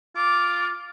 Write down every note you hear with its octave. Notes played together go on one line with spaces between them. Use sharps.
F4 D6